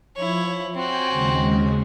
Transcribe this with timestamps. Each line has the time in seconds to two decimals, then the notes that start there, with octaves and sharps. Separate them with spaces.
0.16 F3 E4 C#5
0.74 C4 F#4 G5 G#5
1.09 D#2 C#3 G#3